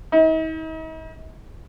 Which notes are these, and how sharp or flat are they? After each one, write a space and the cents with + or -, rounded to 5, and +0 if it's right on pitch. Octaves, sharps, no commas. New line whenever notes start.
D#4 +45